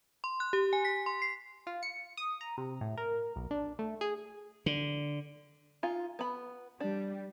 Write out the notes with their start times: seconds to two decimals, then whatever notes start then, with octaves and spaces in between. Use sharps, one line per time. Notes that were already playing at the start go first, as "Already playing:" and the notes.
0.24 C6
0.40 F#6
0.53 G4
0.73 G#5
0.85 B6
1.06 C6
1.22 C7
1.67 F4
1.83 C#7
2.17 D#6
2.41 A#5
2.58 C3
2.81 A2
2.97 A#4
3.36 B1
3.51 D4
3.79 A3
4.01 G#4
4.66 D3
5.83 D#4 F4 G#5
6.19 B3 B5
6.80 G3 D4